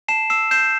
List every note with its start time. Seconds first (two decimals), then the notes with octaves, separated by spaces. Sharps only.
0.08 A5 C7 E7
0.30 E6 C7 E7
0.51 G6 C7 E7